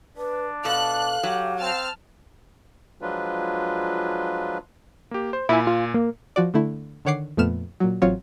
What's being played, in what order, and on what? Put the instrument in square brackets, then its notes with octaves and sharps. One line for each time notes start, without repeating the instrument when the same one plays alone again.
[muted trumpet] D4 [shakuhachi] B4
[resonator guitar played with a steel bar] B2 A4 [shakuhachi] F5 [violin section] F#6
[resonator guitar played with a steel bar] F#3 [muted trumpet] G4
[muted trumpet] C4 [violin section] A5 F6
[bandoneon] F3 F#3 G#3 D4 F4 B4
[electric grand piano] A#3 G4
C5
[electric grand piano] A#2 G#5 [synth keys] E4
[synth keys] F4
A#3
[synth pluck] F3 F#4 D5
D3 A3 E4
D3 D#3 C#5 F#5 D6 C7
F2 A#2 A3 B3 F6 E7
A#2 F#3
A1 F#3 C4 F4 C#5